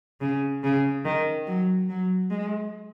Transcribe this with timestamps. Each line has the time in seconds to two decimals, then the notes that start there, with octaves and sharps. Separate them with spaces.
0.21 C#3
0.63 C#3
1.05 D#3
1.47 F#3
1.89 F#3
2.30 G#3